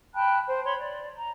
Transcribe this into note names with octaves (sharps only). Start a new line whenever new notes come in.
G5 A5 B5 F#6
C5
C#5 B5 C6
D5
A#5